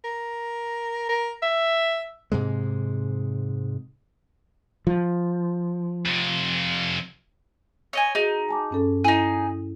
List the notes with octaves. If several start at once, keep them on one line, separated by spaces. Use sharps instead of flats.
A#4
A#4
E5
G#2 C3 G#3
F3
F2 C3
C#5 D#5 G#5
D#4 F#4 G#4
G#5 A5 D6
G2 C#4 A4
D#4 E4 G#4